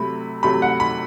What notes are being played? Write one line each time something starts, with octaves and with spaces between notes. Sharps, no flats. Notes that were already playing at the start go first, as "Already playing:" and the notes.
Already playing: C3 F#3 A3 B5
C3 F#3 A3 B5
F#5
B5